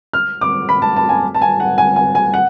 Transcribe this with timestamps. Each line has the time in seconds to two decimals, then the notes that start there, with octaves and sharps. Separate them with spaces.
0.13 F6
0.41 D6
0.69 B5
0.82 A5
0.96 A5
1.09 G#5
1.35 A5
1.42 G#5
1.60 F#5
1.78 G#5
1.96 G#5
2.15 G#5
2.34 F#5